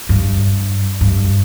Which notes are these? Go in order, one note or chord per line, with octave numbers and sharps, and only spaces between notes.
G2
G2